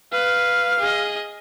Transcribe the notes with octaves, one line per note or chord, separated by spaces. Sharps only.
B4 F5
G#4 D#5